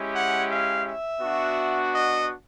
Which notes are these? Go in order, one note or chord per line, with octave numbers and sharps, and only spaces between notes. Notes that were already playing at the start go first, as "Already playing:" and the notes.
Already playing: G#3 C#4 E4 G4
F#5
F5
E5
B3 D4 F#4
D#5